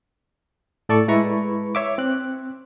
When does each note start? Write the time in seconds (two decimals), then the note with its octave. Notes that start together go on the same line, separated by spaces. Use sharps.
0.89 A2 A4 D5 A5 C#6
1.08 G#3 E4 B4 A#5 B5 C#6
1.75 C#5 E5 D6
1.98 C4 F#6